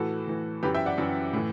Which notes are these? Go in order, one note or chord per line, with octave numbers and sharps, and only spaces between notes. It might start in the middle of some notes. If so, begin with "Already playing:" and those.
Already playing: A2 E3 F#4 A4
A2 E3
F#2 E3 G4 B4
E5 G5
D5 F#5
F#2 E3
A2 E3